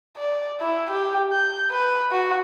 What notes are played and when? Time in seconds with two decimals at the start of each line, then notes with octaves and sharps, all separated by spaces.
0.17 D5
0.61 E4
0.91 G4
1.32 G6
1.71 B4
2.12 F#4